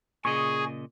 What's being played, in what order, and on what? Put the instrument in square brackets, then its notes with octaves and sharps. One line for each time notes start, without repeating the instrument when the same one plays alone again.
[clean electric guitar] A#2 C#3 D#5 [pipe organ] G#4 [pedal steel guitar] C#6